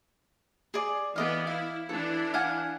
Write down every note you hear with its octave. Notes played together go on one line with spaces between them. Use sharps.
G#4 D5
E3 B3 D5 D#5 F5
E4 F5
E3 D4 E4 A4
F5 F#5 G#5